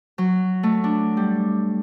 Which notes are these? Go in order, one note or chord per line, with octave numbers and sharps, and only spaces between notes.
F#3
A3
D4
G3